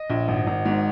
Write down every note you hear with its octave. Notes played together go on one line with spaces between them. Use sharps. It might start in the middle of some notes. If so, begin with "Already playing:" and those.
Already playing: D#5
A#1
G#1
G#1
G#2